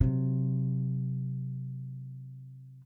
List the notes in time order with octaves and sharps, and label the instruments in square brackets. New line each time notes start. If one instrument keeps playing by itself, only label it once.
[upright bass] C3 F#3